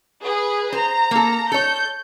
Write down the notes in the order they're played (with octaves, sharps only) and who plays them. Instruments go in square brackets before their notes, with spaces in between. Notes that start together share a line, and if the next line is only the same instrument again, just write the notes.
[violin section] G#4 B4
[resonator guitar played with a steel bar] C5 [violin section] A#5
[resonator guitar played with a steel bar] A#3 A4
[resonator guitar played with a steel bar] A4 C#5 [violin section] G6